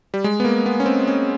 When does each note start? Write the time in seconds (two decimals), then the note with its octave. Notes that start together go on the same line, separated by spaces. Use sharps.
0.14 G3
0.24 G#3
0.40 B3
0.45 A#3
0.66 B3
0.80 C#4
0.86 C4
1.07 C#4